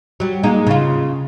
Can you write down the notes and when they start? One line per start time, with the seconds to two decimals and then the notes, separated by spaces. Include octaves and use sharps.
0.20 F#3 G3
0.43 G#3 A#3 D#4
0.67 C#3 F4